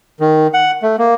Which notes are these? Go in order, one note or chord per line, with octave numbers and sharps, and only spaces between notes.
D#3
F#5
A3
A#3